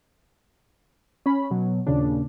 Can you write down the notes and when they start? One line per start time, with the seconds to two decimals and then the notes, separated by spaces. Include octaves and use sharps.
1.26 C#4 B5
1.51 B2 F#3
1.87 D#2 A#2 C#3 D4